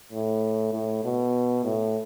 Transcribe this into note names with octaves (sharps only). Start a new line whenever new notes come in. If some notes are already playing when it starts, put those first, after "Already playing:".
A2
A2
B2
A2